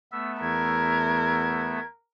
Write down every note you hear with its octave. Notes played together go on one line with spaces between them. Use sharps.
A3 B3 E5 E6
E2 A#4 G#6